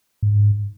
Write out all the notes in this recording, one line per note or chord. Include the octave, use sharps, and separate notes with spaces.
G#2